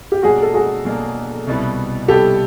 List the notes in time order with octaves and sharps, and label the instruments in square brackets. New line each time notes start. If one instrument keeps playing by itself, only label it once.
[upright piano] G4
[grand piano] B2 F#3 A#3 D4 [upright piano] F#4 G#4
[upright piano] A4
F#4 G#4
[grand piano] B2 F#3 A#3 D4
C2 B2 G3 B3 E4
[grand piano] C2 B2 G3 B3 E4 [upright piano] G4 A4